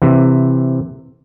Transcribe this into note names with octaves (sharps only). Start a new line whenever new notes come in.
C3 E3